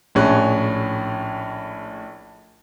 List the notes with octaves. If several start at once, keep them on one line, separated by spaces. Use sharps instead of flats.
A#1 A2 C#4 G#4 F#6